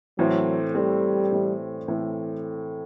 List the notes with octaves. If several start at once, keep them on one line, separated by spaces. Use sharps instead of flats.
A2 E3 F#3 A3 C4
A2 E3 G3 A3 C4
A2 E3 A3 C4
A2 E3 A3 C4